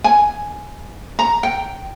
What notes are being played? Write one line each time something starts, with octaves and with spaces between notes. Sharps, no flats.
G#5
A#5
G5